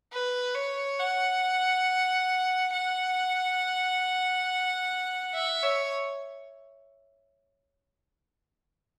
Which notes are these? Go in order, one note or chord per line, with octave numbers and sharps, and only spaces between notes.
B4
C#5
F#5
F#5
E5
C#5